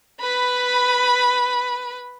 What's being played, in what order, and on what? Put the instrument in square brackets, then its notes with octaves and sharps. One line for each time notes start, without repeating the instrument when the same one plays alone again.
[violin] B4 B5